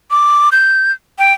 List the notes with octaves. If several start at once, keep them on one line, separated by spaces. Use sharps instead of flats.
D6
G6
G5